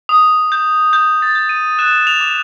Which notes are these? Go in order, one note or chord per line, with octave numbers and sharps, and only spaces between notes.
D#6
G6
G6
A6
G6
D#7
F#6 E7
F7
D6